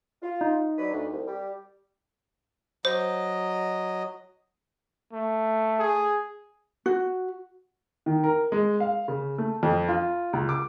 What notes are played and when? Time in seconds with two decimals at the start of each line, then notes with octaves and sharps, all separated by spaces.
0.22 F4
0.41 D#4
0.78 F#3 B4 D5
0.92 D2
1.11 C2
1.27 G3 G4
2.85 F#3 C5 D#5
5.12 A3
5.79 G#4
6.86 F#4
8.06 D#3
8.24 A#4
8.52 G#3
8.80 F5
9.08 C#3
9.38 A3
9.63 F2
9.88 F4
10.33 C#2
10.49 D6